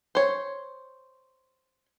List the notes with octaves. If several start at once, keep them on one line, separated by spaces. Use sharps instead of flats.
C5 C#5